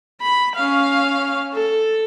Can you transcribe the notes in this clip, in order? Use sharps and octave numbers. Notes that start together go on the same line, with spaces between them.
B5
C#4 F5
A4